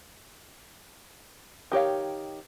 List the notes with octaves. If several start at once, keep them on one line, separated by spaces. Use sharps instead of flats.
D#3 G4 C#5 F5